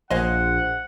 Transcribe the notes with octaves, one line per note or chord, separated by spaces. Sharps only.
A#1 C5 D#5 F5 F#5 G#5